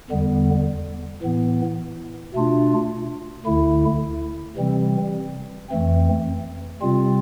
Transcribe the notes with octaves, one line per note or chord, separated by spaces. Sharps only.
E2 D3 G3 B3
A2 E3 B3
B2 A3 D4 F4
D2 D3 A3 E4
C3 E3 G3 C4
F2 E3 A3 C4
C3 G3 C4 F4